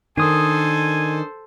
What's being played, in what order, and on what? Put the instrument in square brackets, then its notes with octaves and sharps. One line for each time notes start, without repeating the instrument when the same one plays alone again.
[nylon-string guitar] D#3 [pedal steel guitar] D4 D#6 [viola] A4 C5 [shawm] G#5